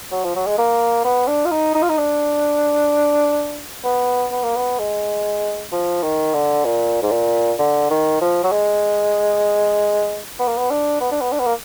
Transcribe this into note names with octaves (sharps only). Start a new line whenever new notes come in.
F#3
F3
F#3
G#3
A#3
B3
D4
F4
D#4
D#4
F4
D#4
D4
B3
B3
A#3
B3
G#3
F3
D#3
D3
A#2
G#2
A#2
D3
D#3
F3
F#3
G#3
B3
A#3
B3
D4
B3
D4
B3
D4
B3
A#3